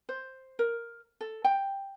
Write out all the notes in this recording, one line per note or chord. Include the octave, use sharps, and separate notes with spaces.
C5
A#4
A4
G5